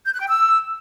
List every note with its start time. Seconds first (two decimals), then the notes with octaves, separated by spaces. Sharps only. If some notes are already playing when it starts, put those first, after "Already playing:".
0.06 G6
0.13 F#6
0.20 G5
0.27 E6